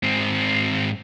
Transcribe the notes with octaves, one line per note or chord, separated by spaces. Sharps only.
G#2 C4